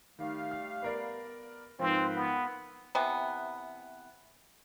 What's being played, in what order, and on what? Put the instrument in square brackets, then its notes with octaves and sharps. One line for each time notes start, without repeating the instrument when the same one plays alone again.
[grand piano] D#3 [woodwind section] G3 A3 F5
[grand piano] F6
B3 A#4 D5
[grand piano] G#2 F3 [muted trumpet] C4 [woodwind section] F4 A#4 B4
[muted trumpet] B3
[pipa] C3 E3 B3